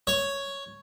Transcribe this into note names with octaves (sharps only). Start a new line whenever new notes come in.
C#5